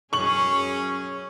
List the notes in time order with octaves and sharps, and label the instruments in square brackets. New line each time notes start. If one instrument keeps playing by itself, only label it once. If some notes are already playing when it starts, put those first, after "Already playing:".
[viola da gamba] F#2 G#4 [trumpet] C#4 [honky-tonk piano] C#6 F#7